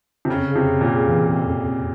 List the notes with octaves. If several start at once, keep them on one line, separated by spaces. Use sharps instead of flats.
C3
F2 C#3
C#3
C3
F2
A#2
C#3
E3
F2
F2
F2